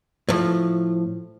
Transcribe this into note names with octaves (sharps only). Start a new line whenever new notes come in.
A2 F3